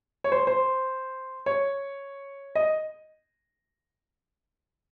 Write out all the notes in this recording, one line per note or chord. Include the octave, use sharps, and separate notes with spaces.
C#5
C5
C5
C#5
D#5